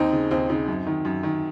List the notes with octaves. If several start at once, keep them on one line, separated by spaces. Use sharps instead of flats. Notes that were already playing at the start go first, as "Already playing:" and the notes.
Already playing: D#2 C4 D#4
C#3
D#2 C4 D#4
C#3 C4 D#4
F#2
D#3
F#2
D#3